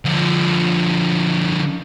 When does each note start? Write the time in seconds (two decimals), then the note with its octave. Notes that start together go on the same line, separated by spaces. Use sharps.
0.05 D3 F3